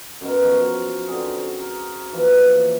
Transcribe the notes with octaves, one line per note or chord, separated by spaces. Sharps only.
F#2 B2 A#4
F3 F#4
D3 C4 F#4 G#4
C5 C#6
A#4
E3 F3 A#3 F4